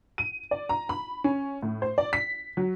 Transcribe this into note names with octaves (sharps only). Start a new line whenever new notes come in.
D#7
D5
A#5
B5
C#4
A2
C5
D5
B6
F#3